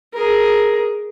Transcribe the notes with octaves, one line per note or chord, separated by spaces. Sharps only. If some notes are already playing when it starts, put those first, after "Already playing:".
G#4 A#4